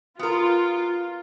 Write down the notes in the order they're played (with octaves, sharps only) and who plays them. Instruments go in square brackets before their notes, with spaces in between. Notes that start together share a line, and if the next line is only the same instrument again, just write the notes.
[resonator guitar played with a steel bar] B3 A#4 [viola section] F4